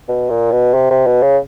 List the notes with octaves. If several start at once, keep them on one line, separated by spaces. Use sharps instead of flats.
B2
A#2
B2
C3
C3
B2
C#3